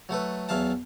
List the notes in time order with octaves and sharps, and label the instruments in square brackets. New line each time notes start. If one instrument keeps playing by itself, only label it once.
[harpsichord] F#3 A3 A4 B4
E2 F#3 E5 F5 A5